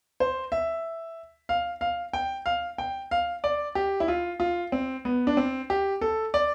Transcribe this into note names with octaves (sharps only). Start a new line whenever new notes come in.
C5
E5
F5
F5
G5
F5
G5
F5
D5
G4
E4
F4
F4
C4
B3
D4
C4
G4
A4
D5